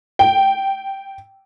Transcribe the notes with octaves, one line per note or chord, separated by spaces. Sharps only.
G5